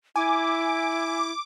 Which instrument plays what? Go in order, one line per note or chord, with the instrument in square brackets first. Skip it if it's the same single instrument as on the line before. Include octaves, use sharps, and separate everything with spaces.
[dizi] E4 [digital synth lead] G#5 [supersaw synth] D6